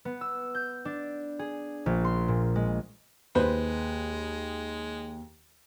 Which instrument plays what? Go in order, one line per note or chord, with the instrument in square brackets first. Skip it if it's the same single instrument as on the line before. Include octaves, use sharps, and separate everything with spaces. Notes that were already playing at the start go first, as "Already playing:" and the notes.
[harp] B3
E6
G6
D4
G#4
A#1
C6
A#2
G#3
[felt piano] D#2 [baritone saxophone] G#3 [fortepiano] B4 C5